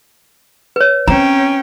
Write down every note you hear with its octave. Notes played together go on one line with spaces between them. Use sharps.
B4 C#5
C4 C#4 G5 A#5